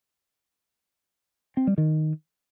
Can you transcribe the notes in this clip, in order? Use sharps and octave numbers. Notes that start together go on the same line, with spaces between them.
C4
G3
D#3